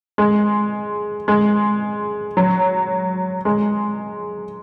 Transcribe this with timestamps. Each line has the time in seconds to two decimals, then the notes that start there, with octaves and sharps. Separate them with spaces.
0.18 G#3
1.28 G#3
2.37 F#3
3.45 G#3